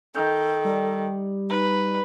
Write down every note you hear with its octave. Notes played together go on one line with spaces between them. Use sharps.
D#3 A4 G6
G3
D#4 B4